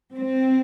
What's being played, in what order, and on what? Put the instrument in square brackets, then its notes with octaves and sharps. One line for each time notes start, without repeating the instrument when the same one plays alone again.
[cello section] C4